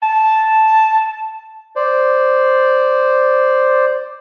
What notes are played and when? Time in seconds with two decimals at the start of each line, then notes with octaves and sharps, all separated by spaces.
0.03 A5
1.76 C5 D5